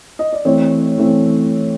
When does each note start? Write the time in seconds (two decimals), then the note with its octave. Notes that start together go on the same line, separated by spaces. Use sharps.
0.19 D#5
0.32 D5
0.45 E3 A3 C4 C#5
0.98 E3 A3 C4